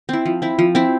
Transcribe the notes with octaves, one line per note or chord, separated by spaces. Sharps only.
C4 E4
F3
C4 E4
F3
C4 E4